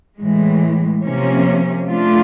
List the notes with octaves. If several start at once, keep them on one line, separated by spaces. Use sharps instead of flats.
A2 E3 G#3
C3 F3 A#3 C#4
F3 A3 D4 F4